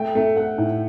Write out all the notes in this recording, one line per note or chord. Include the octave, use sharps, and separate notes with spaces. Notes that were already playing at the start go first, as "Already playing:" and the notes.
Already playing: A3 G5
A3
A3 F#5
A2